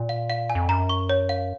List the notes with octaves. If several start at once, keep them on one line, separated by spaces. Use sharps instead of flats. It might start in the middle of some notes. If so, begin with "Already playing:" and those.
Already playing: A#2
F5
F5
G#5
F2
F#2 A#5
C#6
C#5
F5